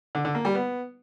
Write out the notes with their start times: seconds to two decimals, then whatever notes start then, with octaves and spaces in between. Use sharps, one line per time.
0.15 D3
0.25 D3
0.35 A#3
0.45 G3
0.55 B3